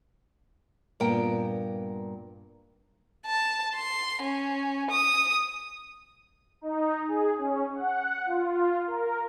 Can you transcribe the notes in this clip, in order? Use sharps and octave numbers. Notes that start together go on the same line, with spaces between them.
G2 A#2 B3 A#4 G5
A5
C6
C#4
D#6
D#4
G#4
C#4
F#5
F4
A#4